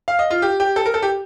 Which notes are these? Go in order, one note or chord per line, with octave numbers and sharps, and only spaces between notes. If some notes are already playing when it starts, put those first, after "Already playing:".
F5
D#5
F4
G4
G4
A4
A#4
A4
G4